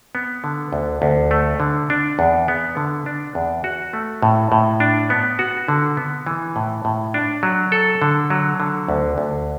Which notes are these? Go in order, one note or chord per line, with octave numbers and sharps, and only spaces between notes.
B3
D3
D2
D2
A3
D3
D4
E2
B3
D3
D4
E2
F#4
A3
A2
A2
D4
B3
F#4
D3
B3
E3
A2
A2
D4
F#3
A4
D3
F#3
D3
D2
D2